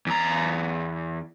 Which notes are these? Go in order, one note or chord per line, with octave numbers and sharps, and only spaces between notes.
E2 A#5